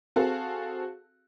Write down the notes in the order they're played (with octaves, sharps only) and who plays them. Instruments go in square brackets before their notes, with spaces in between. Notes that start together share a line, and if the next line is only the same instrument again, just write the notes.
[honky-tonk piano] C4 F#4 G#4 A4 F5 A5